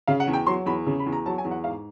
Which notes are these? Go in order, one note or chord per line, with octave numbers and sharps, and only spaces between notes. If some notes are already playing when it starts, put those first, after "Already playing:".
C#3 F5
F#5
E2
G5
F#3 C6
E2 B5
C#3
B5
E2
A#5
F#3 A5
G#5
E2
F#5
G#2 F5